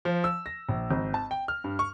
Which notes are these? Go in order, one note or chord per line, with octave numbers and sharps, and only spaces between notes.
F3
E6
A#6
A#1
G#1
A5
G5
F6
G2
C#6